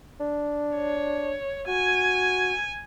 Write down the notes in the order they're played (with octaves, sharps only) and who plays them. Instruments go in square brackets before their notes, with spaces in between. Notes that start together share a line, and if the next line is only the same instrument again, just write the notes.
[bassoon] D4
[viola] C#5
[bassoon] F#4 [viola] G#5